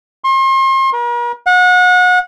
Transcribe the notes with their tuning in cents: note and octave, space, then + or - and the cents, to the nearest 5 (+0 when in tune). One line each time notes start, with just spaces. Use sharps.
C6 +40
A#4 +45
F#5 -30